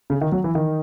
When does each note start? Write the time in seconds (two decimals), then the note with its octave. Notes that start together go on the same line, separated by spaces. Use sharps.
0.10 C#3
0.21 D#3
0.32 F#3
0.44 E3
0.55 D#3